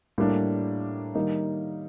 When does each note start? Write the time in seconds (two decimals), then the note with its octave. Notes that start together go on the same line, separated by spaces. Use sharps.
0.18 A2 G3 A#3 D4
1.15 D#3 G3 A#3 D#4